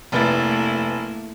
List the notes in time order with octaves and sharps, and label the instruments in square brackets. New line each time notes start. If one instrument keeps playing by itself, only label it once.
[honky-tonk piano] F1 B4 A6 [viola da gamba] A3 A#3 E4